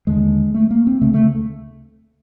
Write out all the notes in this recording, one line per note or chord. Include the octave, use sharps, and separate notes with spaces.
D#2 D3 G#3
A3
A#3
C4
D2 C#3 A3
A3